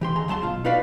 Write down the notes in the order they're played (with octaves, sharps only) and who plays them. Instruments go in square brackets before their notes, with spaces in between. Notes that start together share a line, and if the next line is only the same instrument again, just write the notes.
[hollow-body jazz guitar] E3 G4 C6
D#2 G#4 A#5 C6
D2 F#3 A5 C6
B2 F4
D#4 F4 F#4 B4 D5 F5